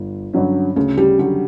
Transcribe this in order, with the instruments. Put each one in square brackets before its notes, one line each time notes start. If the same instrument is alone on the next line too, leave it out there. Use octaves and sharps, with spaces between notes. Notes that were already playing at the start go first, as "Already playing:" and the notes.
Already playing: [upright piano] G1
G2 D3 F#3 C#4
[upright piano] D2 [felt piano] C#3
[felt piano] G3
[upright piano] D3 F#3 [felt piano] G3